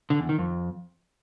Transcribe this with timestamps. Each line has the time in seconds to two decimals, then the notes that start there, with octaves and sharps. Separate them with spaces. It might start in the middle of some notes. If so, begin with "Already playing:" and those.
0.10 D3
0.20 E2
0.29 D#3
0.39 F2